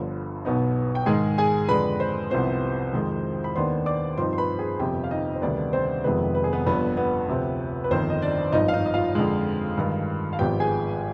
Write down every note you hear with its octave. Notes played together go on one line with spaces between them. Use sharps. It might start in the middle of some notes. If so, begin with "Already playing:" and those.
Already playing: G1 G2 D3 F3
B1 B2 B3 D#4
G5
G#2 D#3 G#3 G#4 G#5
G#4 G#5
F2 D3 G#3 D4 B4 B5
C5 C6
C2 C3 F3 B3 C5 C6
F2 D#3 G#3
B5
D#2 D#3 B3 D4 C5 C6
D5 D6
G2 F3 C4 D#4 C5 C6
C6
B4 B5
G#4 G#5
G1 F2 C3 G4 G5
F5
D#4 D#5
C5
D2 C3 D#3 G3 B3 D4 D5
C4 C5
F1 F2 C3 D#3 G#3 B3 B4
B4
G#4
B3 B4
G1 G2 F3 B3 D4 B4
B3 B4
D2 C3 F3 C4
B4
G1 F2 D#3 C4 C5
D#5
D4 D5
G#1 G2 F3 D#4 D#5
F5
D#4 D#5
D#5
F4 F5
F2 D3 G#3
G2 D#3 G#3
F5
G#1 G#2 F3 B3 G4 G5
G#4 G#5